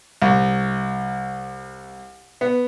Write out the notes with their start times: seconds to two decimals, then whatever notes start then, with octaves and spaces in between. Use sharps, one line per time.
0.22 C2
2.41 B3